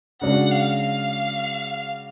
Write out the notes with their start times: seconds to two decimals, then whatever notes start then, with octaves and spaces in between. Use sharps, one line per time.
0.21 C#3 G#3 D4 F#4 F#5
0.51 F5
0.81 F5